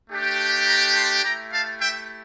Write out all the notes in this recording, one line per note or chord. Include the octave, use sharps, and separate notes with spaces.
A3 D4 G4
A#5 D6
A5 C6
A3 E4 G4 G5 A#5
F5 A5
E5 G5